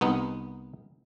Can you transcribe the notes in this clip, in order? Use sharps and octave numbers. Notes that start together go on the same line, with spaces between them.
C2 B3 D#4